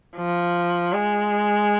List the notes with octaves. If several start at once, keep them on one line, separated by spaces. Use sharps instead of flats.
F3
G#3